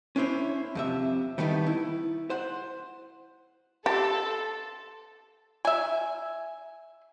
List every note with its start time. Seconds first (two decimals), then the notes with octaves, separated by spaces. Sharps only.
0.16 C#4 D4 E4 C5 C#5
0.75 F2 C3 E5
1.38 A2 D#3 G3 A3 B3 D#4
1.67 E4
2.30 C5 F#5
3.86 G4 A4 A5 C6
5.65 E5 G#5